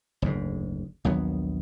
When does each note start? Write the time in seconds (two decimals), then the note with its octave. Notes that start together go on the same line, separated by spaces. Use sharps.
0.22 F#1 D2 G#2
1.05 A#1 D#2 F#3 B3